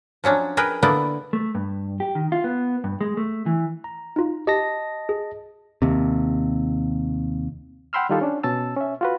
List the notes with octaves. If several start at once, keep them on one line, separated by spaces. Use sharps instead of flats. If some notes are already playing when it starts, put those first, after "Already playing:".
F3 F#3 C#4 D4
G#4 A#4 B4 G5
D3 A#3 B3 E4 D5
A3
G2
G4
D#3
F4
B3
G2
G#3
A3
E3
A#5
D#4 F4
G4 D#5 A5 A#6
G#4
D#2 C3
F#5 G5 B5 C6 E6 F6
D#3 G3 D#4 F4 G4 A4
C#4 D4
B2 C#4 A5 E6
C#4 E5
F4 F#4 B4